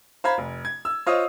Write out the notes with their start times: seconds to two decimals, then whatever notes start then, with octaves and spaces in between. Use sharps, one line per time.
0.24 C5 F5 A#5 B5 G#6
0.38 F1
0.65 G#6
0.85 E6
1.06 F4 C5 C#5 D#5 F5 D#6